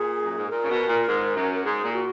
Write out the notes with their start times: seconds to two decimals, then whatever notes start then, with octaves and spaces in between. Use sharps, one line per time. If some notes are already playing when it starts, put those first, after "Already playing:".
Already playing: A#2 G#4
0.22 F#2
0.37 G#2
0.50 A#2 A#4
0.63 C#3
0.69 B2
0.88 A#2
1.07 G#2
1.36 F#2
1.54 A#4
1.64 G#2 G#4
1.83 A#2
1.93 F#4